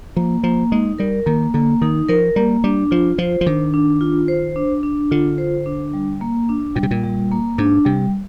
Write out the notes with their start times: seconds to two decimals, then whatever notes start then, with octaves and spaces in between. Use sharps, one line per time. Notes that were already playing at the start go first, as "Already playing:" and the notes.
0.16 F3 A#3
0.43 F3 A#3
0.72 G#3 D#4
0.99 G3 A#4
1.26 D#3 A#3
1.54 D3 A#3
1.82 D#3 D#4
2.09 F3 A#4
2.36 G3 A#3
2.64 G3 D4
2.91 F3 F4
3.18 F3 C5
3.41 F3
3.46 D#3 D4
3.74 D4
4.01 F4
4.28 C5
4.56 D4
4.83 D4
5.11 D3 F4
5.38 C5
5.66 D4
5.93 G3
6.21 A#3
6.49 D4
6.76 A#2 G3
6.83 C3
6.91 A#2
7.03 G3
7.32 A#3
7.58 G#2 D4
7.85 C3 G3